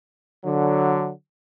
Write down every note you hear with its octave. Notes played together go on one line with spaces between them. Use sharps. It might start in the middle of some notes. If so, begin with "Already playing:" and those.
D3 F#3